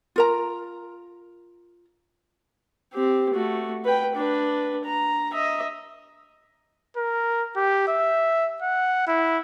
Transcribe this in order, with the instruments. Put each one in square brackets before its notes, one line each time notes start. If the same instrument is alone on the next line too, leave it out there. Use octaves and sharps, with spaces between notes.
[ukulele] F4 A#4 A#5
[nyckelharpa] C4 G4
A3 F#4
B4 G5
D4 B4
A#5
D#5 E5
[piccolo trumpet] A#4
G4
E5
F#5
E4